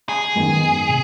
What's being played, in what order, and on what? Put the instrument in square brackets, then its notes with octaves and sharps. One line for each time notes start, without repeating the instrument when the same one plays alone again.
[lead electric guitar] G#4
[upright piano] F#2 D#3 G#3 B3
C3